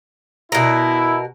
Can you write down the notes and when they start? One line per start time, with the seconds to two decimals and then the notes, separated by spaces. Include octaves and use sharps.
0.52 B2 E4 A#4